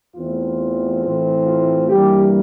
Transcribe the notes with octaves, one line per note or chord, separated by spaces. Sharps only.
E2 E3 A3 C4 F4
A2 E3 A3 C4
F4
G2 E3 G3 A#3 G4